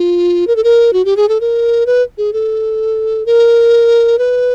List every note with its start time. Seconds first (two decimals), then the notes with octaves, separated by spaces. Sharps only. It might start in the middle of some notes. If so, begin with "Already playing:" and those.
Already playing: F4
0.47 A#4
0.56 A4
0.64 A#4
0.93 F#4
1.05 G4
1.17 G#4
1.29 A4
1.41 A#4
1.86 B4
2.18 G#4
2.33 A4
3.26 A#4
4.19 B4